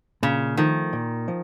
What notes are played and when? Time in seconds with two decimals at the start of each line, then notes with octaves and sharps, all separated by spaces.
0.23 A#2 C#3
0.57 D#3 F3 A3
0.93 A#2
1.28 F3